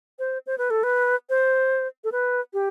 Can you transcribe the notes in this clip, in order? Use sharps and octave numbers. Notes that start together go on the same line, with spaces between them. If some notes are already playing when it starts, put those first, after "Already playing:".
C5
C5
B4
A4
B4
C5
A4
B4
G4